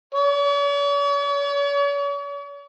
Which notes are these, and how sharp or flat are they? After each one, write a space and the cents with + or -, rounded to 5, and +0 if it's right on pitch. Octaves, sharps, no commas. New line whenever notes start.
C#5 +45